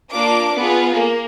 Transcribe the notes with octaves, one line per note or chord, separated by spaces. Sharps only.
A#3 D4 F4 D6
B3 F4 G#4
A#3